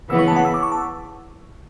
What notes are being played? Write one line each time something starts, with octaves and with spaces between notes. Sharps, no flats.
C#3 E3 B3 E6
C#6
A5
F#5
E6
D6
C#6
A5